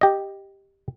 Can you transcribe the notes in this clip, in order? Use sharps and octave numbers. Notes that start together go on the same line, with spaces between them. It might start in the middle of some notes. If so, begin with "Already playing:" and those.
G4 D#5